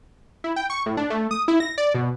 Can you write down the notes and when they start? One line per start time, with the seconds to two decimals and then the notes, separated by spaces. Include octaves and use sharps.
0.44 E4
0.56 G5
0.70 C#6
0.86 A2
0.97 D4
1.10 A3
1.31 D#6
1.48 E4
1.60 A#6
1.78 D5
1.95 B2